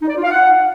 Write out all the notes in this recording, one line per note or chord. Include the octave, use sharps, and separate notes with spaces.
D#4
D5
F4
F5
F#5